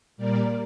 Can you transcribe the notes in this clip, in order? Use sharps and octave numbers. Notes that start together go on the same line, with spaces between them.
A#2 G3 A#3 A#4 D5